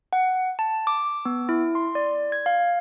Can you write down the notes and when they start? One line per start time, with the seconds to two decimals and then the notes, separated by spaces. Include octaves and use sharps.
0.13 F#5
0.59 A5
0.87 D6
1.25 B3
1.49 E4
1.75 C6
1.95 D5
2.32 G#6
2.46 F5